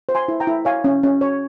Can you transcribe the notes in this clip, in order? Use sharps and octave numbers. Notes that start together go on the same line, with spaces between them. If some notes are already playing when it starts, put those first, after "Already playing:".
C5
G#5 C6
E4
G5 A#5
E4
C#5 F5 G#5
C#4
C#4
C#5